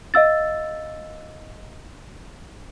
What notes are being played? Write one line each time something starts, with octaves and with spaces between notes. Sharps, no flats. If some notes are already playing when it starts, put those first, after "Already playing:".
D#5 F5 E6 A6